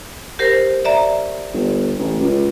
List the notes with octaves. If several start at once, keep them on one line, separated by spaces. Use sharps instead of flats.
G4 A#4 C5
D5 E5 A#5
G1
A1
C#2